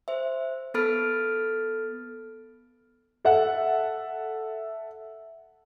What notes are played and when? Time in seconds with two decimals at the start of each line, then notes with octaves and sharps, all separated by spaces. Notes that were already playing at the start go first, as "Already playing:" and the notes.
0.08 C5 E5
0.74 B3 A4 B5 F6 A6 D7
3.25 A4 E5 F#5